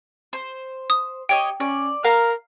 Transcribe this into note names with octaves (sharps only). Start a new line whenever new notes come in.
C5
D#6
G4 C#5 D#5 G5
C#4 D5
A#4 F5 A#5 F6